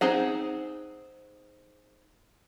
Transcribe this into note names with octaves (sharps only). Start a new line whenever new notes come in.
C4 D#4 G#4 F#5